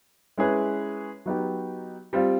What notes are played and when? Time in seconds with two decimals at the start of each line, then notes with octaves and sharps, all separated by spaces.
0.38 G#3 C#4 E4 G#4 B4
1.26 F#3 B3 D#4 G4
2.13 G3 C4 F4